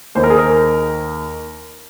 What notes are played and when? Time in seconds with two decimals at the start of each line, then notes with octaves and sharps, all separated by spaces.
0.15 D#2 D#3 A#3 C5
0.24 A#4
0.30 G#4
0.38 A#4